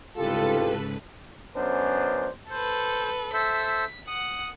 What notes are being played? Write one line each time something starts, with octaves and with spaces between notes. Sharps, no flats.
C2 G#2 C#3 F4 G4 A4 B4
F#2 B3 C#4 D4 C5
A4 B4 C5
A4 C5 E5 B6
F#5 D#6